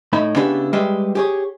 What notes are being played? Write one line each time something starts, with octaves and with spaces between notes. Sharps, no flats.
A2 D#4 E5 B5
C#3 B3 D4 E4 G4 B4
G3 G#3 G4 B4 E5
G4 G#4 C#5